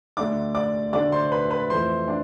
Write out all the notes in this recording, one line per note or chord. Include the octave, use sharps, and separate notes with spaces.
D2 D3 A3 D4 D5 D6
D5 D6
D2 D3 A3 D4 D5 D6
C5 C6
B4 B5
B4 B5
F2 E3 A3 C5 C6
D4 D5